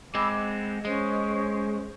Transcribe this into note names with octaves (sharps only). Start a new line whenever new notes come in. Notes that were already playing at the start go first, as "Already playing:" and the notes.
G#3 C4 B5 D6 E6
F#5
G#3 C#4 C5